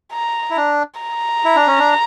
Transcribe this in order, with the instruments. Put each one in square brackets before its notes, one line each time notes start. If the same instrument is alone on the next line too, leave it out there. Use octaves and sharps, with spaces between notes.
[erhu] A#5
[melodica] E4
D4
[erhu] A#5
[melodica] E4
D4
C#4
D4